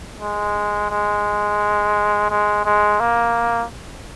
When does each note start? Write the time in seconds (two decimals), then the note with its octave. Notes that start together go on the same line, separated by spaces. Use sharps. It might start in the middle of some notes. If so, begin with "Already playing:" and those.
0.20 G#3
0.90 G#3
2.30 G#3
2.65 G#3
3.00 A#3